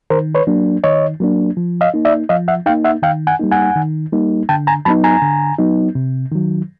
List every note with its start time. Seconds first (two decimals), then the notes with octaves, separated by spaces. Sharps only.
0.10 D#3 A#4 C5
0.35 B4 C#5
0.47 F#3 A#3 D4
0.84 D#3 C#5 D#5
1.20 F#3 A#3 D4
1.57 F3
1.81 D#5 F5
1.94 A#3 D#4
2.05 D5 E5
2.29 F3 D#5 F5
2.48 E5 F#5
2.66 D#4 F5 G5
2.69 A#3
2.85 E5 F#5
3.03 D#3 F5 G5
3.27 F#5 G#5
3.40 G3 A#3 D#4
3.51 F#5 G#5
3.76 D#3
4.13 G3 A#3 D#4
4.49 D3 G5 A5
4.67 G#5 A#5
4.85 F#3 B3 D#4 A5 B5
5.04 G#5 A#5
5.22 D3
5.58 F#3 B3 D#4
5.95 C3
6.32 D#3 F#3